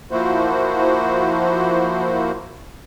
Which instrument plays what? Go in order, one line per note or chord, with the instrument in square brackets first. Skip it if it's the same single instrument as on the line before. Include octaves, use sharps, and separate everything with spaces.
[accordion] F3 A#3 E4 F#4 C5